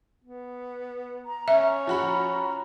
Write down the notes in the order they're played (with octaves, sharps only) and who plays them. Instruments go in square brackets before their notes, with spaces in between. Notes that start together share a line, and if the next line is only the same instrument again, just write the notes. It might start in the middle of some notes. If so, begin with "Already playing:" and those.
[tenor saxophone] B3
[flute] A#5
[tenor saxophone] C#4 [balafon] E5
[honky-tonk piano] F3 F#4 B5